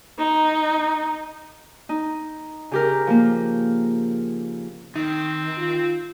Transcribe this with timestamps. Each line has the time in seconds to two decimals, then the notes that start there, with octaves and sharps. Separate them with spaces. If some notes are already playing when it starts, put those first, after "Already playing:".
0.19 D#4
1.89 D#4
2.71 C#3 G4 A#4
3.07 F3 A#3
4.96 D#3 C4 D#4
5.58 F4